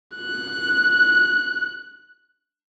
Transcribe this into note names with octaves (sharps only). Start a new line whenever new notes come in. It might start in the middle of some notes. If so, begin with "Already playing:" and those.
F#6